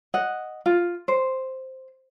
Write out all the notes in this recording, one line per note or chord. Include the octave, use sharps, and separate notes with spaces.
D#5 F#5
F4
C5